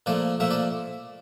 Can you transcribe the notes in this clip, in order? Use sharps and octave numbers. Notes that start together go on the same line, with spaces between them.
A#2 F3 A3 D5
A#2 F3 A3 E5
D5